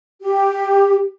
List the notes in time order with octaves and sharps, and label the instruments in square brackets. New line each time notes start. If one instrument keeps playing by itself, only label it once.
[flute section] G4